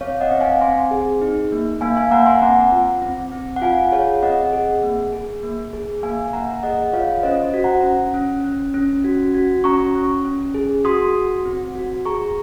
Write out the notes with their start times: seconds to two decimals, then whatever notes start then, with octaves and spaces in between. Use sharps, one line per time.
0.01 C4 C#5 F5
0.21 D#5 F#5
0.31 C4
0.41 F5 G#5
0.61 C4 G#5 C6
0.91 G#4
1.21 D#4
1.52 A#3
1.81 A#3 F5 G#5
1.96 F5 G#5
2.11 A#3 F#5 A#5
2.26 G#5 C6
2.42 C4 F#5 A#5
2.72 F4
3.02 C4
3.32 C4
3.56 F#5
3.62 F4 F5 G#5
3.92 G#4 C#5 F5
4.22 C4 D#5 F#5
4.53 G#4
4.83 A#3
5.12 G#4
5.43 A#3
5.73 G#4
6.03 A#3 F5 G#5
6.33 A#3 F#5 A#5
6.63 G#4 D#5 F#5
6.93 F4 C#5 F5
7.23 C#4 C5 D#5
7.43 C5
7.54 F#4
7.64 F#5 A#5
7.84 C#4
8.14 C#4
8.44 C#4
8.74 C#4
9.04 F#4
9.34 F#4
9.64 C#4 A#5 C#6
9.95 C#4
10.25 C#4
10.54 G#4
10.85 F#4 C6 D#6
11.16 F#4
11.46 C4
11.75 F#4
12.05 G#4 A#5 C#6